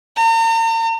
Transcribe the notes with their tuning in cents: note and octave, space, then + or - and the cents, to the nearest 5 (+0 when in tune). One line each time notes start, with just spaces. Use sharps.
A#5 -45